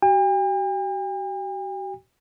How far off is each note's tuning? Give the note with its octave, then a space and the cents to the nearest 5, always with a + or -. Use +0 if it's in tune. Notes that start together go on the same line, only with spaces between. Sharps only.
F#4 +45 G5 +45